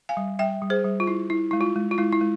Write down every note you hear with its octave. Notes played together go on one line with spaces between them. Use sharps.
F5 G#5
G3
G3 E5 G5
G3
G#4 C5
G3
F4
E4
E4
G#3 E4
F4
G#3
F4
G#3 E4
E4
G#3